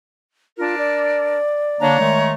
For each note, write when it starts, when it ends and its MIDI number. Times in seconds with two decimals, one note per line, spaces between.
0.58 1.37 62
0.58 0.75 65
0.58 1.37 70
0.78 2.10 74
1.81 1.98 50
1.81 1.98 58
1.81 1.98 62
1.81 2.33 73
1.81 2.33 82
2.00 2.34 51
2.00 2.34 56
2.00 2.34 57